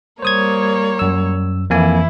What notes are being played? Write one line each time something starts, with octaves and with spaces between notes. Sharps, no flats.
G3 A#3 C5 C#5 D#6 G#6
F#2 E6
F2 E3 A#3 E4 G#5